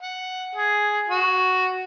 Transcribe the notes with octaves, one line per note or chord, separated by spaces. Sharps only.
F#5
G#4
F#4